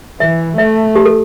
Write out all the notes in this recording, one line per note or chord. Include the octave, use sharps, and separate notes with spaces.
E3 E5
A3 E5
G4
A4